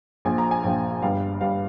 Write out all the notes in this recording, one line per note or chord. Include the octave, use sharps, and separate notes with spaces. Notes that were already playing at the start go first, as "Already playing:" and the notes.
A#1 A#2 F3 G#5
A#5
G#5
A#1 A#2 F3 G5
G1 G2 G3 F5
G1 G2 G3 F5